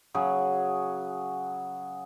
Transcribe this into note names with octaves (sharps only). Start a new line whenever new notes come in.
C#3 F#3 G#4